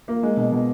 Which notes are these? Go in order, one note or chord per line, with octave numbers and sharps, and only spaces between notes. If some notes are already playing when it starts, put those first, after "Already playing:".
A#3
G#3
B2
B2